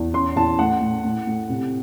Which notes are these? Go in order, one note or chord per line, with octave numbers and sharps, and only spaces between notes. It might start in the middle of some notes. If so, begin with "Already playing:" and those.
Already playing: E2
C#4 C6
E2 A5
A2 F#5
A2
A2
A2
C3